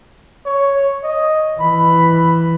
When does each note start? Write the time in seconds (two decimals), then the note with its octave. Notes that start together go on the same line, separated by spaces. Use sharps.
0.46 C#5
1.04 D#5
1.61 E3 B5